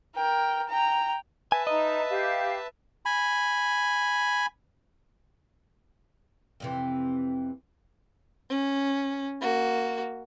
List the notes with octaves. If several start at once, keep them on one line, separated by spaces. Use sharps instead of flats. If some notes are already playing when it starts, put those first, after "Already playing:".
A#4 G5
G5 A#5
B4 E5 G#5 A5
D#4 D#5 A#5
G4 F5
G#5 B5
F2 C3 E3
C#4
A#3 F#4